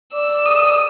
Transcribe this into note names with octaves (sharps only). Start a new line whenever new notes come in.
D5 E6
D#6